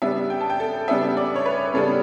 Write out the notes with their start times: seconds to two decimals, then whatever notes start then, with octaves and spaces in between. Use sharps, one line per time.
0.02 C#3 G3 B3 D4 E5
0.30 G5
0.41 A5
0.50 G5
0.60 A4
0.88 C#3 G3 B3 D4 E5
1.17 D5
1.36 C#5
1.46 B4
1.74 C#3 G3 B3 D4 A4